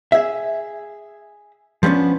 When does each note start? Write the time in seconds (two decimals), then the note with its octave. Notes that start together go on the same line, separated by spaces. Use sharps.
0.12 G#4 E5
1.83 F3 G3 B3 C#4 D4